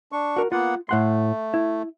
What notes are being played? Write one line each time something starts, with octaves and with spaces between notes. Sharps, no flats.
D4 C#6
F#4 A#4
A#3 B3 F4 F#5
A2 A3 F#5 C6
E4